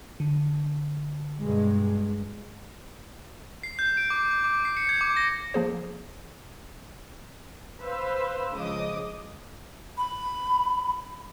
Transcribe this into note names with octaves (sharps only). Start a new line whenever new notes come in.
D3
G2 B2 G#3
C7
G6
D7
D6
D6
D6
C7
C#7
G#6
D6
A#6
F3 A#3 G#4 C5
B4 C5 F5 E6
C#2 C#3 F3 D#5 D6 D#6
B5